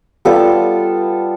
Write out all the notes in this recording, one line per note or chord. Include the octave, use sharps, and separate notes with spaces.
G3 B3 F4 A4